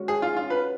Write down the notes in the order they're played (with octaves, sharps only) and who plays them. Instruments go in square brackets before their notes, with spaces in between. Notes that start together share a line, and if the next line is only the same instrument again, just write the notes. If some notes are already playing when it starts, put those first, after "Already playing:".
Already playing: [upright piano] G#3 C#4 F#4
[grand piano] G#4
F4
F4
B4